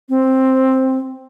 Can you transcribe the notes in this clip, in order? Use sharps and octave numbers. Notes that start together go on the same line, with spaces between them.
C4